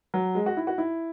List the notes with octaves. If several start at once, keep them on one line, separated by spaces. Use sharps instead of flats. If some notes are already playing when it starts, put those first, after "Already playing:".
F#3
G#3
F#4
E4
F#4
E4